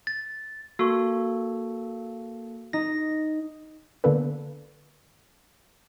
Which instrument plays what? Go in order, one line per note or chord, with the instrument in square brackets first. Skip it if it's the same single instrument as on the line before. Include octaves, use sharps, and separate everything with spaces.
[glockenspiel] A6
[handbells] A#3 A4 [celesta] F#4 C#6
[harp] D#4 [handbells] A#6
[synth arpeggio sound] D3 A#3 B3 D4 A4 B4